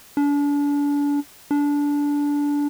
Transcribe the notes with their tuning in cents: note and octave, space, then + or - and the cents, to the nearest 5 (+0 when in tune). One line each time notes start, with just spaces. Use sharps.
D4 -35
D4 -20